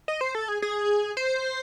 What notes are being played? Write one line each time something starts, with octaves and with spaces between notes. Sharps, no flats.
D#5
C5
A4
G#4
G#4
C5